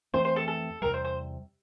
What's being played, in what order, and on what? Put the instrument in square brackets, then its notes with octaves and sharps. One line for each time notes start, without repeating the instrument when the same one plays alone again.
[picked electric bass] F2 E3 A3 C4 [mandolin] C5
[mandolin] C5
A4
A4
[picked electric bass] E2 C3 G3 [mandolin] A#4
[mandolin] C5
C5